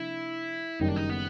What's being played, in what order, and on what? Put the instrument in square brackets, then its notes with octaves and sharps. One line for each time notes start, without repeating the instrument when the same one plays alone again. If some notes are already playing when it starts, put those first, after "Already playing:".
Already playing: [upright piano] C3 F3 A#3 D4 [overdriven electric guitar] E4
[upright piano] F#1 F#2 D#3 G3 [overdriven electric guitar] D#4
[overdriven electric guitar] D4
D#4
B3